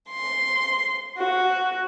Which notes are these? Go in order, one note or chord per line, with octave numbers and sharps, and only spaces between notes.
C6
F#4